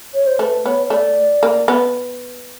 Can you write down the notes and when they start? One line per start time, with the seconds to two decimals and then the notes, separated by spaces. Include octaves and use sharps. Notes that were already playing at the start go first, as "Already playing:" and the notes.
0.14 C#5
0.26 C5
0.39 A3 B4
0.65 B3 C#5
0.90 A3 D5
1.43 A#3
1.68 B3